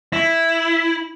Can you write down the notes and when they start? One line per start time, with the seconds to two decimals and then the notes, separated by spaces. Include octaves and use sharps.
0.13 E4